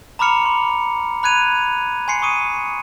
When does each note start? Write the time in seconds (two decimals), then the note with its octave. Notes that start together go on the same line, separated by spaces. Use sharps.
0.19 A#5 B5 D6 F6 C#7 F7
0.46 C6
1.23 B5 F#6 G#6 D#7 F7
2.08 G#5 C6 C7 C#7
2.22 C#6 D#6 D#7